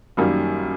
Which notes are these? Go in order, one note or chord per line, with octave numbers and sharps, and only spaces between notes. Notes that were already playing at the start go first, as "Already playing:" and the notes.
F#2 D#3 G3 A#3